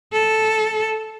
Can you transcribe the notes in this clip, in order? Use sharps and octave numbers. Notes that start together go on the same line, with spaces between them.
A4